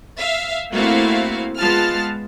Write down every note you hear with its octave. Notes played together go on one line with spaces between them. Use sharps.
E5 F5
A3 A#3 C4 E4 F#4 F5
G#3 B3 F4 A5 F6